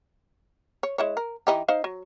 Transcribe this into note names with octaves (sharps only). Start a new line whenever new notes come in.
C#5
G#3 E4 C#5
A#4
E3 D#4 G4
D#4 C5 F5
F#3